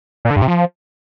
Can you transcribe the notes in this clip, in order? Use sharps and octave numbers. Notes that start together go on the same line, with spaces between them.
A#2
D3
G2
C3
F3